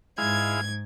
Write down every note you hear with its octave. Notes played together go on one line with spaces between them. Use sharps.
G#2 G#3 E4 F5 G#6